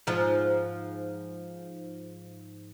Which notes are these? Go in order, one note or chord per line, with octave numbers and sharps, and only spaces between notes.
G#2 F3